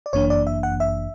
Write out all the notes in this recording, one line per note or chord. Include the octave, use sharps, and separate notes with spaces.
D5
G1 F#2 E3 A#3 D4 C#5
D5
E5
F#5
E5